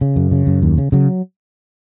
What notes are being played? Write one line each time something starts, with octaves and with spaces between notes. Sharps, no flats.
C#3
F#2
C#3
F#2
D#2
C#3
C#3 F#3